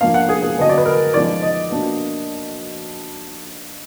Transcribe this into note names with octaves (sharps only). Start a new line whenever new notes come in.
F3 A#3 D4 F5
F#5
G#4
G#4
D3 F#3 B3 D4 D#5
D5
B4
A#4
F3 G#3 B3 D#4 D5
D#5
B2 A#3 D4